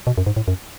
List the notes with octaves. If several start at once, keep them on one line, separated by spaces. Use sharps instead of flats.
B2
F#2
G#2
A2
F#2